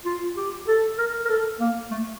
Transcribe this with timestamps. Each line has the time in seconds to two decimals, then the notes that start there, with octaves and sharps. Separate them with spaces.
0.05 F4
0.37 G4
0.68 A4
0.98 A#4
1.25 A#4
1.29 A4
1.60 A#3
1.91 A3